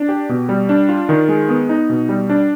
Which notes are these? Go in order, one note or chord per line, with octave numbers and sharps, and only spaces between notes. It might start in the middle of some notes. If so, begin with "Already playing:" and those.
Already playing: D4
G4
B2
G3
D4
F4
D#3
G#3
B3
D#4
B2
G3
D4